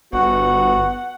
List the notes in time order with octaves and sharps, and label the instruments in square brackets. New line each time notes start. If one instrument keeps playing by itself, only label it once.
[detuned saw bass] G1 [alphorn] B3 [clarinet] F#4 [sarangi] F#5